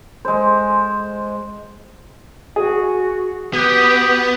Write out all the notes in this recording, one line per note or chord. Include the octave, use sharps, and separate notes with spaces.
G#3 C5
F#4 G#4
B3 F#4 G4 D#6